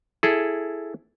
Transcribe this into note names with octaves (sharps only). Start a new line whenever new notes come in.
E4 G#4 A4